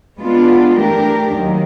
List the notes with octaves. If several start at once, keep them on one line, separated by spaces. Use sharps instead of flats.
G#3 B3 D4 F4
E3 A3 D4 G4 A#4
D#2 D#3 F#3